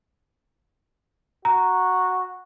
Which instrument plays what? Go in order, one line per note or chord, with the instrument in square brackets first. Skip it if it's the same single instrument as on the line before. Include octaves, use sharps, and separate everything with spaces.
[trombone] F#4 [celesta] A#5